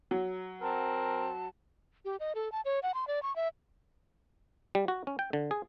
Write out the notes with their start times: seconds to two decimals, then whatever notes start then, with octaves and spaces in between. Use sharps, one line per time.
0.11 F#3
0.62 C4 A#4 A5
2.05 G4
2.20 D#5
2.35 A4
2.52 A5
2.65 C#5
2.83 F#5
2.94 C6
3.07 D5
3.23 C#6
3.36 E5
4.75 G3
4.88 F#4
5.07 C#4
5.19 G5
5.33 D3
5.51 G#4